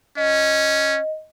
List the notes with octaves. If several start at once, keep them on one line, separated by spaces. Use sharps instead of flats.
C#4 D#5